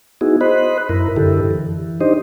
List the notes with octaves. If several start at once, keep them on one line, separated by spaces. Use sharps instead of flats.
B3 D#4 E4 F#4 G#4
C5 D#5 B5 F#6
F#2 E4 A#4
F#2 D3 E4 G4 A4
E3
D4 D#4 G4 C5 D#5